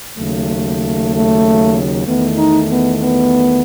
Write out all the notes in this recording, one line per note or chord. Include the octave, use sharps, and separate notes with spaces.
D#2 C#3 F#3 A3
A3
E2 D#3 A3 B3
D#4
B3
B3